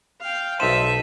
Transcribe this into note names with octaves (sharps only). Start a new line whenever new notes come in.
F5 G5
B1 D#4 C5 E5 A5 C6 D#7 E7